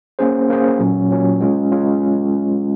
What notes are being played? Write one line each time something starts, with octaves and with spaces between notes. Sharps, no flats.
A#3 C#4 G#4 C5
A#3 C#4 G#4 C5
A#2 F#3 C#4
A#2 F#3 C#4
G#3 C#4 F4
G#3 C#4 F4